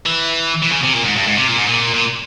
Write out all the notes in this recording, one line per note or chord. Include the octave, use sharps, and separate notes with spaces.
E3
E3
C#3
C3
A#2
G#2
G2
G#2
C3
A#2
G#2
A#2
A#2